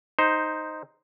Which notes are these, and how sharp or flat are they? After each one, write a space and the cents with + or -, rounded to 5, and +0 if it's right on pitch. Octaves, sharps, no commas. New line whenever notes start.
D#4 +0 C5 +0